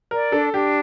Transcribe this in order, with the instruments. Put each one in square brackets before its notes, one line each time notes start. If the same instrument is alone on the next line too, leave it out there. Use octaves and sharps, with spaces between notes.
[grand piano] A#4 [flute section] D5
[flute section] D4 [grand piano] A4
[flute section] D4 [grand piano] G4